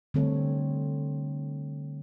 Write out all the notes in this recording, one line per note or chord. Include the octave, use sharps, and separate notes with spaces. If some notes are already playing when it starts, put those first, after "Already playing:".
D3 G3 A3 C4 A4 C#5